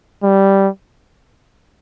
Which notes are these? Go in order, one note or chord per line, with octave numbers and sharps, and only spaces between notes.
G3